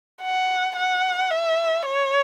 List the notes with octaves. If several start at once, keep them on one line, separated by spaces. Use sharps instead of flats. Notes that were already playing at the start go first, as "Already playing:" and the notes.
F#5
F#5
E5
C#5